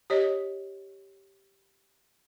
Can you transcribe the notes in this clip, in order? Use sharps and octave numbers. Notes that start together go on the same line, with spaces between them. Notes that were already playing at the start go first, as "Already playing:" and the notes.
G4 C#5 D#5